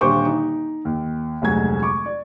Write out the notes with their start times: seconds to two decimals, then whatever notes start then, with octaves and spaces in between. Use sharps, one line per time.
0.01 D#1 D3 G3 C5 C#6 D6
0.25 D#4
0.85 D#2
1.42 F1 D2 F#3 G#3 F#4 G#6
1.82 C#6 D6
2.06 D5